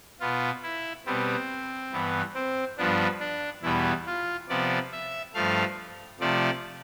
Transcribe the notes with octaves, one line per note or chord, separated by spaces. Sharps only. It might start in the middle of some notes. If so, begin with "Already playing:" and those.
B2 B3 F4
E4
B2 G3 B3 C4
G2 E3 B3
C4
G2 F3 B3 D4
D4
E2 B2 G3 B3 E4
F4
C3 F3 B3 D5
E5
G2 F3 A3 F5
C3 F3 A3 D5